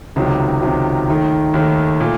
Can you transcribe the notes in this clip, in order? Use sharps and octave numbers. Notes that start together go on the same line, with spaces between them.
C#2 C3 D#3 F#3
C#2 C3 D#3 F#3
D#2 D#3 A3
D#2 D#3 A3
A#2 A3